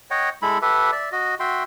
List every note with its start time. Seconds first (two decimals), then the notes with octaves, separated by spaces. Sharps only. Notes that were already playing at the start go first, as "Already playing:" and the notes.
0.11 C#5 D#5 F#5 G5
0.42 G#3 E4 A4 B5
0.62 G4 A4 B4 E5
0.92 D5 E5
1.12 F#4 D#5
1.40 F#4 E5 G5 C6